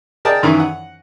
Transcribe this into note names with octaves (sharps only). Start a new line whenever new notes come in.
G#4 A#4 D5 D#5 G5 A5
F#2 D#3 E3 E4
F#5